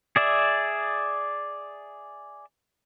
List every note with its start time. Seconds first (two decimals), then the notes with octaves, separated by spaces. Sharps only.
0.16 G#4 D5 E5